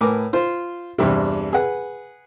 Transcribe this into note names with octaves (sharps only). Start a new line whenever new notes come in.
A2 A#4 B4 G#5 D6
F4 C5
E2 G2 C3
G#4 B4 F#5